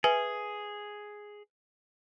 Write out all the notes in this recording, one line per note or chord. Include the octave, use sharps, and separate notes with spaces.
G#4 B4 E5 G#5